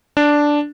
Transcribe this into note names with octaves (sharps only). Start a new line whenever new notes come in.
D4